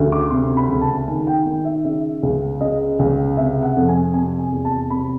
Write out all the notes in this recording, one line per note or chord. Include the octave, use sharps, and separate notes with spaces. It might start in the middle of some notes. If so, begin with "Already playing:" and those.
Already playing: D2 C#3
D6
C3 C6
B5
C#2
A5
D#3 G#5
G5
D#3
E5
C#3 E5
C#2
C#3 D#5
C#2
C3 E5
F#5
F2
G#5
C3 G#5
G#5
E2
A5
C3 B5